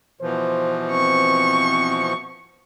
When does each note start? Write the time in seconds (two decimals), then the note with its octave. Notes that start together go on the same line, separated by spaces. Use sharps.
0.21 B2 E3 F3 C5
0.92 C4 C#6